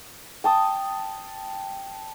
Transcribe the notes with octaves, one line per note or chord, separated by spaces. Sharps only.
G5 A5 D#6